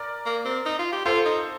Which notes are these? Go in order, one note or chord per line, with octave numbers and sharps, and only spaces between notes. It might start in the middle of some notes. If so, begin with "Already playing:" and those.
Already playing: A#4 D5
A#3
C4
D#4
F4
G4
F4 A4 C5
D#4